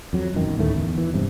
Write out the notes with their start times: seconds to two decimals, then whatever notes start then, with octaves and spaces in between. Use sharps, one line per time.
0.13 F2 F#3
0.34 E1 F#2 D#3
0.58 D2 A2 D#3 A3
0.76 E2
0.98 E3
1.14 E1 G2 C3